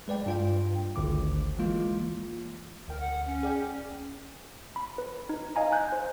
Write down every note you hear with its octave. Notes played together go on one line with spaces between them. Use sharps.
G#3 B4 D5 G5
G2 F4 G5
G#1 D2 D3 D6
E3 G#3 A#3 F4
D2 A#4 G5
F#5
C#4
G#4 D5 G5
B5
B4
D#4
D#5 F5 G#5 A#5
G#5 F#6 G6
C5